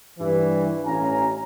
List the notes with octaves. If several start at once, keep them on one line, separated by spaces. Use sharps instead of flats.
G2 E3
A1 C#4 F5 G#5 A#5